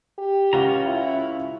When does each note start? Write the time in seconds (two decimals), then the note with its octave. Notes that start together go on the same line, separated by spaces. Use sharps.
0.18 G4
0.53 C#2 C#4 F4 F#5 A#5 C#6
0.86 E4